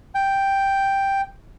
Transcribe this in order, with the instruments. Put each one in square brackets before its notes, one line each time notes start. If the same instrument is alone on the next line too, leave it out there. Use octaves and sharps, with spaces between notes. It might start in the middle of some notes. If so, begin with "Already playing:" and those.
[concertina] G5